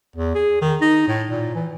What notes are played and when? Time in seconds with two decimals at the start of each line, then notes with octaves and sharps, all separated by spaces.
0.16 E2
0.35 G#4
0.62 D#3
0.81 D#4
1.08 A2
1.30 A#2
1.55 E3